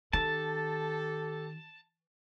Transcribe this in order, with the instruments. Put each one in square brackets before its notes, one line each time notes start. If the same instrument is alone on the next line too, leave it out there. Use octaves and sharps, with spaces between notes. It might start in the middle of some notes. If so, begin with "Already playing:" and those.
[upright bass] D#3 [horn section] G4 A4 [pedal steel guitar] A5